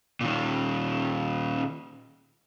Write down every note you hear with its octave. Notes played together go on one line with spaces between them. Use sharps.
A#2 D#3